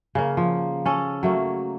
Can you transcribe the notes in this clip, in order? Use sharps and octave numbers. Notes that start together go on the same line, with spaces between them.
C#3 A#3
F3
C#4 A4
F#3 A3 A#3